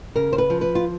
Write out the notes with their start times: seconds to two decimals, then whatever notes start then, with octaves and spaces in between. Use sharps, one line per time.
0.16 C#3 A#4
0.33 C5
0.38 B4
0.50 F3
0.61 B4
0.75 F4